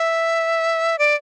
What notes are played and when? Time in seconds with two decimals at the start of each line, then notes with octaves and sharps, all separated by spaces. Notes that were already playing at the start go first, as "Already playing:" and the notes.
Already playing: E5
0.99 D5